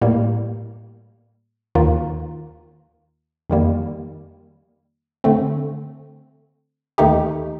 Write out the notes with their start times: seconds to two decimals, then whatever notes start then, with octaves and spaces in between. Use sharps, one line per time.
0.01 A2 G3 A#3
1.75 D#2 D#3 A#3 F4 A#4
3.50 F2 D#3 G3 A#3
5.24 D3 A3 C4
6.98 D#2 D#3 A3 D#4 G4